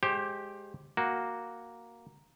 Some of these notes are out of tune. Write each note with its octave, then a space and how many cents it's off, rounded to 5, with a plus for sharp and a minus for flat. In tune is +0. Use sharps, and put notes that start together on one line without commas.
G#3 +0 G4 -5 C5 +25
A#3 +0 F#4 +0